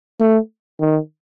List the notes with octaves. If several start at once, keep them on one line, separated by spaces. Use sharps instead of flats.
A3
D#3